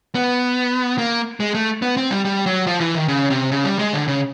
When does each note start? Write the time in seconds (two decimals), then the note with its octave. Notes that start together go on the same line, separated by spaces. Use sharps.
0.15 B3
0.98 A#3
1.40 G#3
1.55 A3
1.82 B3
1.97 C4
2.11 G3
2.25 G3
2.46 F#3
2.67 F3
2.80 E3
2.95 D#3
3.08 C#3
3.30 C3
3.51 C#3
3.65 G3
3.79 G#3
3.93 D3
4.08 C#3